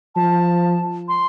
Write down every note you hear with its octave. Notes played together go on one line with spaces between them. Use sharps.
F3 A5
C6